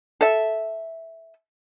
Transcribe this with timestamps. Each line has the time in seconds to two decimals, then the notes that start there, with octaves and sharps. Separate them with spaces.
0.21 A4 E5